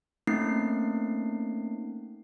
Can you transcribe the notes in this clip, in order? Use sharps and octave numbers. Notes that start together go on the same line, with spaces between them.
A3 A#3 C4 C#4 D#4 C7